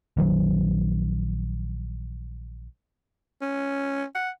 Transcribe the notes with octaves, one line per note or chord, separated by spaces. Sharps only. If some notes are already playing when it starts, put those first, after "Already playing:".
A#1 D#3 F#3
C#4
F#5